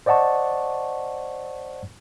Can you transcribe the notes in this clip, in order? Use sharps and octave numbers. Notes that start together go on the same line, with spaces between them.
C5 D5 D#5 F#5 A5 C#6